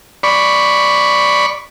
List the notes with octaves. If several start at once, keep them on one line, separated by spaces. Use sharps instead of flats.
D5 B5 C#6